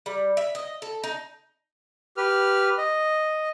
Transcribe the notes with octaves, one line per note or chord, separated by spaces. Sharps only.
G3
E5
D#5
A4
D#4
G4 B4 F6
D#5